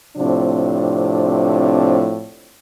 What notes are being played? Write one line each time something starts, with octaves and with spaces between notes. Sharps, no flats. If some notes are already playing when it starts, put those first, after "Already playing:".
A2 C3 F3 C4 D4